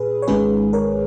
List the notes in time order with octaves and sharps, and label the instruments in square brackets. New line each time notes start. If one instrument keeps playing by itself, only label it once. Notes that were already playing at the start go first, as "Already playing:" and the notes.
Already playing: [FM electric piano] A#2 G#4 B4
C#5
G#1 G#2 D#3 G#3 C#4 G#4 B4
A#4 C#5